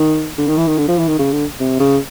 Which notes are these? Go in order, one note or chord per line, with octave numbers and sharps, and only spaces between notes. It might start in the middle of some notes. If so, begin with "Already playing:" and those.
Already playing: D#3
D3
D#3
E3
D#3
D3
F3
E3
D#3
C#3
D3
C3
C#3